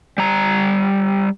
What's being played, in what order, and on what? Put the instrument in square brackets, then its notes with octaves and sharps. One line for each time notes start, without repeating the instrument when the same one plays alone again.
[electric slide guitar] G3 A#5